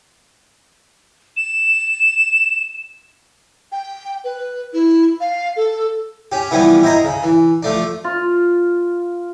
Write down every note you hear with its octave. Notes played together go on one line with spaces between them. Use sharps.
E7
G5
B4
E4
F5
A4
C#4 G4
E3 F3 G3 B3 E4
E4 C5 D#5 A#5
C#3
E3
F3 A3 D4
F4